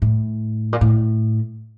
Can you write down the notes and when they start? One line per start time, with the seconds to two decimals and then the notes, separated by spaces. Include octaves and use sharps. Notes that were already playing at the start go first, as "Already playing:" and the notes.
0.02 A2
0.73 A#2
0.81 A2